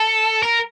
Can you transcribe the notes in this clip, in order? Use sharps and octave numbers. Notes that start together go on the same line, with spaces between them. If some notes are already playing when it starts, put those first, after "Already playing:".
Already playing: A4
A#4